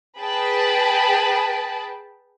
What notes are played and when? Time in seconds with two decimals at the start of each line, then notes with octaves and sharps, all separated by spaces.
0.19 G#4 B4 G5 A5 B5